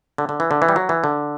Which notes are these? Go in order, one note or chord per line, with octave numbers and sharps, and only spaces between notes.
D3
D3
E3
D3
E3
G3
F#3
E3
D3